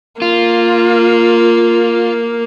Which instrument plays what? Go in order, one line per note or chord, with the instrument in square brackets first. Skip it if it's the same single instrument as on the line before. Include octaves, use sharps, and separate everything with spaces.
[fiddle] A#3 [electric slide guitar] F4